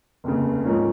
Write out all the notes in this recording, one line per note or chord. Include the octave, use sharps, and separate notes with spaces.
F1 D#2 C#3
G#2 F3 A#3 C#4